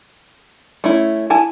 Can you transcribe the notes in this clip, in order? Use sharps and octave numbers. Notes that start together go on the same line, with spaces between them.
A3 C#4 E4
E4 G#5 A5